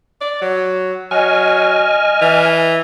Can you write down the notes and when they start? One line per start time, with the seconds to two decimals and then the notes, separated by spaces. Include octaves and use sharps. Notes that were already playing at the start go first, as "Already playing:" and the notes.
0.21 D5
0.42 F#3
1.11 F#3 D#5 G#5 F6
2.21 E3